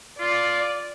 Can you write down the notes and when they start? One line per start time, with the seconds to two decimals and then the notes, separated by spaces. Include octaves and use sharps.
0.19 F4 D5